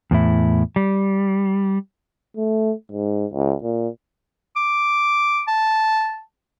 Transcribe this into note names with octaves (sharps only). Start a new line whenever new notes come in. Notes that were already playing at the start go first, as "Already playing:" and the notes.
E2 A2 E4
G3
A3
G#2
C#2
A#2
D6
A5